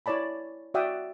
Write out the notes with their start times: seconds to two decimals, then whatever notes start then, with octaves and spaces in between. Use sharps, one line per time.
0.06 E4 C#5 D5 A5 B5
0.74 F#4 D5 E5 F#5 G5 D#6